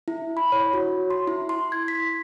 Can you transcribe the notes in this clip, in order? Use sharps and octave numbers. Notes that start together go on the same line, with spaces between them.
E4
B5
C#5
F#4
C6
E4
C6
G#6
B6